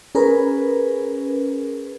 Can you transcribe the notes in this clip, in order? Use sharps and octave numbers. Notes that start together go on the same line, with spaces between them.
C#4 G#4 A#4 B4